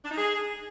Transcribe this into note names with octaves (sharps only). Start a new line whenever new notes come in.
D4
D#4
G#4